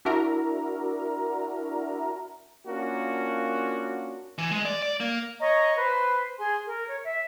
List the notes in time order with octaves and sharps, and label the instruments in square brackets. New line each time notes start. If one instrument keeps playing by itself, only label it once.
[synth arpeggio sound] D4 E4 F#4 A#4 E5 A#5
[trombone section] A#3 C#4 D4 F4 F#4 A#4
[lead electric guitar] E3
G#3
D5
D5
A#3
[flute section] C#5 D#5 A#5 C#6
B4 C5
G#4 G#5 C6
A#4
C#5
E5